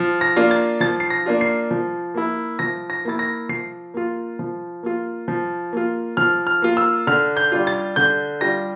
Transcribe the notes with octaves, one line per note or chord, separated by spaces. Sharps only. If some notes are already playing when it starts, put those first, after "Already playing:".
Already playing: F3
A#6
A#3 D4 F4
A6
F3 A6
C7
A#6
A#3 D4 F4
C7
F3
A#3 E4
F3 A#6
A#6
A#3 E4 A6
A#6
F3 C7
A#3 F4
F3
A#3 F4
F3
A#3 F4
F3 F6
F6
A#3 F4
E6
D3 F6
G6
G3 D4 F4
A6
D3 G6
G3 D4 F4 A#6